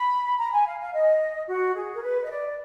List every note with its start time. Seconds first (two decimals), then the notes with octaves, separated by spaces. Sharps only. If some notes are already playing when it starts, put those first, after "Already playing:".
Already playing: B5
0.38 A#5
0.52 G#5
0.65 F5
0.79 F5
0.93 D#5
1.47 F#4
1.75 G#4
1.94 A#4
2.02 B4
2.24 D#5
2.29 D5